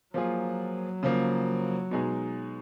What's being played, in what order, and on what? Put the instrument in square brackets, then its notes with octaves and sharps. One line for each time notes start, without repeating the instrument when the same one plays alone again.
[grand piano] F3 A#3 F4 G#4 [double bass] F#3
[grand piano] C#3 F3 A#3
B2 G#3 D#4 G#4